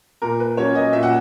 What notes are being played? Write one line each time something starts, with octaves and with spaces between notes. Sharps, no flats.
A#2 A#4
B4
F#3 C#4 C#5
D#5
A#2 E5
F#5